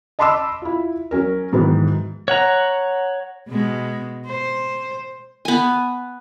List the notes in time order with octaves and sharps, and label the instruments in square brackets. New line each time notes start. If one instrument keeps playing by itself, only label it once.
[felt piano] D#5 A5 B5 C6 D6 E6
E4 F4
F#3 C#4 A#4
G#2 D#3 E3 F#3 B3
[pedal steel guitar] C#5 F#5 A#5
[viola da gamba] B2 G#3
C5
[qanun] B3 G#5